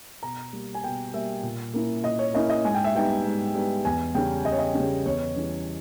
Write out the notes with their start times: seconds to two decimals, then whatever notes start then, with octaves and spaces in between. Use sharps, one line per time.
0.23 B2 A#5
0.53 G3 A#3
0.75 G#5
0.84 B2 G5
1.13 G3 A#3 E5
1.43 A#2
1.74 A#3 C#4 E4
2.04 A#2 D#5
2.19 C#5
2.34 A#3 C#4 E4 D#5
2.50 D#5
2.65 G#2 G#5
2.74 G5
2.84 E5
2.95 G3 B3 D#4 G5
3.25 G#2
3.55 G3 B3 D#4
3.85 E2 G#5
4.15 C#3 G3 C#4 G5
4.45 E2 D#5
4.52 C#5
4.59 D#5
4.75 C#3 G3 C#4
5.06 E2 C#5
5.35 C#3 E3 G3 C#4